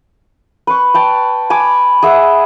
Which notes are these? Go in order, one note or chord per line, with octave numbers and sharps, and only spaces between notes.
B4 C#6
B4 G5 A5
G#5 B5 D6
G#4 D#5 E5 F#5